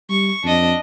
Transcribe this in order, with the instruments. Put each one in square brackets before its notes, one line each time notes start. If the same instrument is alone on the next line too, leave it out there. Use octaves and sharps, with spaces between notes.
[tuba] G3 [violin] C#6
[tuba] F2 [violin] D4 D#5